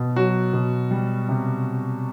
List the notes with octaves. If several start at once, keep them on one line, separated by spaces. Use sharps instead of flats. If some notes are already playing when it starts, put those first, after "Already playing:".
Already playing: B2
F#3 F#4
B2
G3
C3